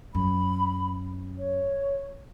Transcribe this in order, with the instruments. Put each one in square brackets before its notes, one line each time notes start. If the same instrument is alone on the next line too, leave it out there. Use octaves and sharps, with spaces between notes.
[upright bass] F#2 [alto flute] B5
[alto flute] C#5